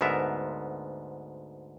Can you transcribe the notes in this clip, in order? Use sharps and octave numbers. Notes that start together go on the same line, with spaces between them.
D2 G#2 B3 A#4 E5